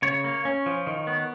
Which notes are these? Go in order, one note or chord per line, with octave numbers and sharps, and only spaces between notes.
C#3 C#5
A#3
C#4
F3
D#3
B3